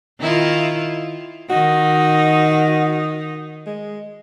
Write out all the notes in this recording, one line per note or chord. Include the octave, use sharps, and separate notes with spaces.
D#3 E4 F4
D#3 D#4 F#4
G#3